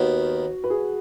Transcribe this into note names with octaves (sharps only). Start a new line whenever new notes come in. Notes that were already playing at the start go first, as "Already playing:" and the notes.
Already playing: D#2 D#3 B3 F#4
B4
G#4